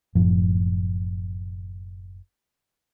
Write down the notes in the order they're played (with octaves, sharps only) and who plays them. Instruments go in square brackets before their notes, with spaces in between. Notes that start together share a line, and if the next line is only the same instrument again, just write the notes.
[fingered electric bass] F#1 F#2 A2 F3